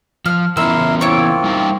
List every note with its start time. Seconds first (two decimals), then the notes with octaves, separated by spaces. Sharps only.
0.26 F3 F6
0.57 E3 B3 C#4 E4 A#4 C6 E6
1.01 A#3 C4 E4 F4 C#5
1.44 G3 D#4 G5